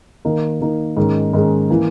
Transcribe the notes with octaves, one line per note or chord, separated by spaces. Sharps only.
D#3 A#3 D#4
D#3 A#3 D#4
G#2 D#3 G#3 C#4
G#2 D#3 G#3 C#4
E3 A#3